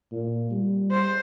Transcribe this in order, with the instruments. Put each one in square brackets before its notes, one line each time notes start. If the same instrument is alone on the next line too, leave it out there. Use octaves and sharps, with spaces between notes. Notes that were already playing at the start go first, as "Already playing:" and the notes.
[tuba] A#2
G3
[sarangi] C5